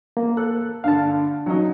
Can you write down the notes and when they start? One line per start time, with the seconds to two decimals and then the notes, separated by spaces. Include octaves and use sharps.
0.17 A#3
0.37 A4 F#6
0.84 G2 D3 F5 A5
1.46 F#3 C#4 D#4